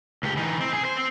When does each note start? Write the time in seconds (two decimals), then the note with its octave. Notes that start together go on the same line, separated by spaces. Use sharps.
0.23 C#2 G4
0.37 E3 D#4
0.61 C4
0.73 G#4
0.85 C5
0.97 C4